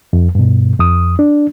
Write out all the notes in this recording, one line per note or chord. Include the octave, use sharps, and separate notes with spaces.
F2
G2 B2
F2 D#6
D4